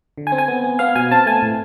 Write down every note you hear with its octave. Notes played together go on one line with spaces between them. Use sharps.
D3
G#5
C4
G#5
B3
B3
B3 F5
B2 G#5
C4 A5
A3 G#5
A2